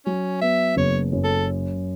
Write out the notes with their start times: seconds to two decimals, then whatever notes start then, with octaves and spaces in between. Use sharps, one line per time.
0.06 F#3 C#4
0.41 B3 E5
0.76 F#1 C#5
1.12 F#2
1.24 A4